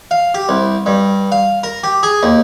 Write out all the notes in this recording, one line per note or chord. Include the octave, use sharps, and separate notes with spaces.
F5
G4
C2
G2
F5
A#4
G4
G#4
D#2